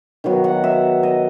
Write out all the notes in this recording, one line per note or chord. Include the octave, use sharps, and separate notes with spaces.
D#3 F#3 B3
F#5
E5
D#5